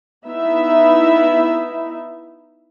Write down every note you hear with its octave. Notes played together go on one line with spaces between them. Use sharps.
B3 D#4 E4 E5